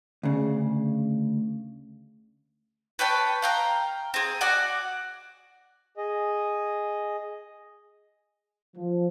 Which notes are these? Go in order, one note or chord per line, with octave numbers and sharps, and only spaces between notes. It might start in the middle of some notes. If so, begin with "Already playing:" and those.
D2 C#3
B4 C#5 G5 A5
F5 G5 A#5
C4 G#4
F#4 D5 F#5 G#5
G#4 D#5
F3